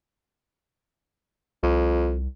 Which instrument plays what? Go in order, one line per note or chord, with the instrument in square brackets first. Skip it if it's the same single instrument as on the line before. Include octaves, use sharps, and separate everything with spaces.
[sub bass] C2 [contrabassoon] F2